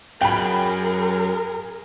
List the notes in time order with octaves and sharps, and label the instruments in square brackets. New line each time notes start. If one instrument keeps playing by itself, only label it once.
[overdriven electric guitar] F#2 [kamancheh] G#4 A#4 [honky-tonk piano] G5 B5